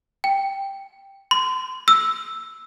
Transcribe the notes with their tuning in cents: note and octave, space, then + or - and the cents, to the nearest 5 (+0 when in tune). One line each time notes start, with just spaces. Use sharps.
G5 +5
C6 -30
E6 +0